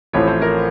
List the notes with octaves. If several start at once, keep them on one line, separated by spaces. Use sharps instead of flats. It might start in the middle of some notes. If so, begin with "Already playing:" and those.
A1 A2 F3 A3 C4 C#5
C5
A#4